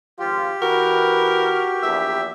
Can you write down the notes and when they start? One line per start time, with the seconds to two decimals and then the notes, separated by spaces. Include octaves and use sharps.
0.19 G#1 F3 F4 G4
0.62 E3 F#4 A#4 B4
1.83 A#1 E2 E5